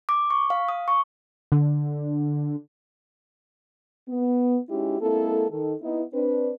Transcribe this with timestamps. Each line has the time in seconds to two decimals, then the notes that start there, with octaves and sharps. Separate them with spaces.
0.09 D6
0.30 C#6
0.50 F5
0.69 D#6
0.88 C#6
1.52 D3
4.08 B3
4.69 G#3 C#4 D#4 E4 F#4 G4
5.01 G#3 A#3 C4 E4 A4
5.50 D#3 A4
5.81 B3 D#4 E4
6.13 C4 D4 B4